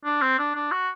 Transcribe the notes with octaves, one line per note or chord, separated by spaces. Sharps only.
D4
C4
D4
D4
F#4